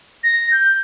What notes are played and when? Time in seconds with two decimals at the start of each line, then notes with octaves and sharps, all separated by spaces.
0.23 A#6
0.51 G6